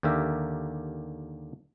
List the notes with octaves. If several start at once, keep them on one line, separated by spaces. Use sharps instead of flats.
D#2 D3 A#3 G4 A#4 E5